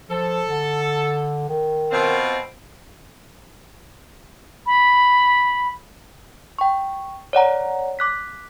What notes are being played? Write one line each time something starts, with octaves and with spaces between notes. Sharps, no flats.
F3 A4
D3
D#3
B2 C4 F4
B5
G5 C#6
C#5 D5 F#5 A#5
D6 F#6 B6